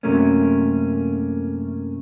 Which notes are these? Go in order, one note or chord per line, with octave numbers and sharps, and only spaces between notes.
F#2 C3 F#3 A3 A#3 C#4